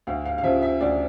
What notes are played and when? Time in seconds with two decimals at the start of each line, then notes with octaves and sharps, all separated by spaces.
0.07 D2 F5
0.25 F5
0.38 F5
0.43 C#3 F3 E5
0.62 E5
0.81 D2 D5